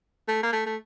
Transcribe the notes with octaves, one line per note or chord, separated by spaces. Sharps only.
A3
A#3
A3
A3